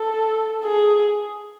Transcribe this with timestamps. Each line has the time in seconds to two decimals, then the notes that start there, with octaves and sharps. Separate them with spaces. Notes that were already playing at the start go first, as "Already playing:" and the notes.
Already playing: A4
0.65 G#4